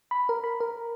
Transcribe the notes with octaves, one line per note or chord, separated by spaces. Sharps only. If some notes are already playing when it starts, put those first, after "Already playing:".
B5
A#4
B5
A#4